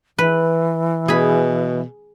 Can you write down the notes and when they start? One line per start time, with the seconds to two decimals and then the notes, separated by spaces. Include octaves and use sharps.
0.18 E3 B4
1.08 B2 G#4 B5